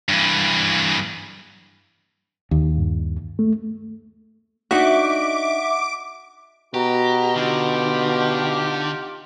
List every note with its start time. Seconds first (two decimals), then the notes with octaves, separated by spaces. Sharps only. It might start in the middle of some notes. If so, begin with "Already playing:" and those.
0.09 G2 E3
2.51 D#2
2.78 G2
3.39 A3
4.71 D4 D#4 F#4 E5 D6
6.74 B2 F#4 G4 A#5
7.36 D3 D#4 F4 G4